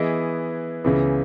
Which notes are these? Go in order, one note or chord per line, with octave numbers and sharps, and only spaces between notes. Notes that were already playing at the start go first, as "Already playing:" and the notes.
Already playing: E3 B3 E4 G#4 D#5
C#2 C#3 E3 B3